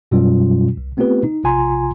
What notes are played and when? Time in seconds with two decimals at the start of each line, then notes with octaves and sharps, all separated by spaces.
0.11 F#2 B2 F#3 G3 C#4 F4
0.77 C2
0.97 A3 B3 C4 F4 G4 B4
1.24 D#4
1.44 A#1 C3 F4 G#5 A#5 C6